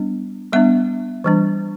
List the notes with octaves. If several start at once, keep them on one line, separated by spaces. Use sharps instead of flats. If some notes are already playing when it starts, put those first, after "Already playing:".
Already playing: G3 B3 D4
G3 B3 D4 E5
E3 G3 D4